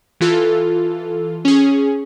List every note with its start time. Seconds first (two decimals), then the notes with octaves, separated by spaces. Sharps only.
0.21 E3 F4 A4
1.45 C#4 G#4